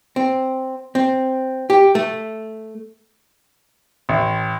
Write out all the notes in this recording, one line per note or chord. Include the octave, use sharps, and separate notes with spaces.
C4
C4
G4
A3
A1